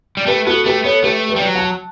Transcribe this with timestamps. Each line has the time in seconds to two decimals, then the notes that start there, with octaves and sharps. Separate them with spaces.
0.17 G3
0.26 A3 G4 B4
0.46 B3 F#4 A4
0.65 A3 G4 B4
0.84 B3 A4 C#5
1.03 A3 G4 B4
1.29 G4 B4
1.36 G3
1.42 F#3
1.55 F#5 A5